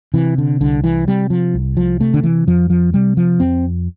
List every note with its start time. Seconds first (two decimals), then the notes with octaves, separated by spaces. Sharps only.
0.14 C3 E3
0.38 D3
0.61 C2 D3
0.84 E3
1.07 C3 G3
1.30 F3
1.54 C2
1.77 F3
2.00 C3 A3
2.14 D3
2.23 E3
2.47 F2 F3
2.70 F3
2.93 C3 G3
3.17 F3
3.40 F2 C4